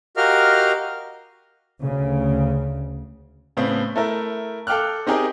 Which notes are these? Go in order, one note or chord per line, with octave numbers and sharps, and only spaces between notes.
F#4 G4 A#4 D#5 F5 F6
D2 C#3
A2 C#3 B3 C4
A3 E4 A#4
A4 F5 G5 D6 F6 F#6
C4 D#4 G4 G#4 A#4 D#5